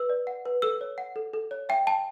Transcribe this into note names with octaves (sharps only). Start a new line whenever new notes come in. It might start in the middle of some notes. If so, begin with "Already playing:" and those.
Already playing: B4 E6
D5
F#5
B4
A4 E6
C#5
F#5
A4
A4
C#5
E5 G5
G5 A5